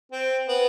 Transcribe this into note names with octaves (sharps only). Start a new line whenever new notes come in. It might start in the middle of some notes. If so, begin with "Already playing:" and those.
C4
B3